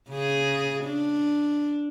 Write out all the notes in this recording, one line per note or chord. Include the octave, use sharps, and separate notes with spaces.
C#3 G#4
D4